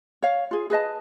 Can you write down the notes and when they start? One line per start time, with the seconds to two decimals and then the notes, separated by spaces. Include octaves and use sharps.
0.22 C#5 F5
0.51 F4 G#4
0.70 G#4 B4 D#5 A5